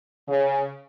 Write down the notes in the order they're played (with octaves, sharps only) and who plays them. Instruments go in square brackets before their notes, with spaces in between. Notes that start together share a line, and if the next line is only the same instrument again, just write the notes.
[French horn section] C#3